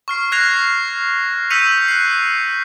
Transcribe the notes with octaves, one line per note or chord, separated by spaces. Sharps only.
C#6 F6 C7
F6 F#6 G#6 A#6 C7 F7
E6 G6 B6 C#7 D#7 F7
F#6 C7